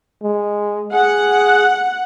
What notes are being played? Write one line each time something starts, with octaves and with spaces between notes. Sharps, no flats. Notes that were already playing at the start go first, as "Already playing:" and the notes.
G#3
G#4 F#5